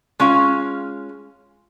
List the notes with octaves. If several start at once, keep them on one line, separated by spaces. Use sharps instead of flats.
G#3 C#4 F4 F5